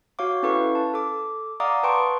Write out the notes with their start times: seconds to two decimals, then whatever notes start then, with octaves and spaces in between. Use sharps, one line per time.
0.19 F#4 C#5 F5 D6
0.43 C#4 E4 A4 B4 F5 C#6
0.75 A5
0.94 A4 D6
1.60 D5 F5 F#5 A#5 D6 D#6
1.83 B4 G5 A5 C6 C#6 D7